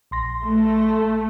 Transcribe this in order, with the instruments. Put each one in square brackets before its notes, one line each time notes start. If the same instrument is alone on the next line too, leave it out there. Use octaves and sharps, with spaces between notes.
[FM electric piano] A#1 C6 A#6
[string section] A3